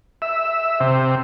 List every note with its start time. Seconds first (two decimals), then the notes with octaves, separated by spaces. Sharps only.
0.22 E5
0.80 C3